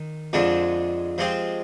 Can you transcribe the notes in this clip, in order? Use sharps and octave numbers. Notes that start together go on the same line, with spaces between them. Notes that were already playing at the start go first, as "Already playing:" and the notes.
Already playing: D#3
F2 D3 F3 G#3 D4
F3 G#3 C4 G4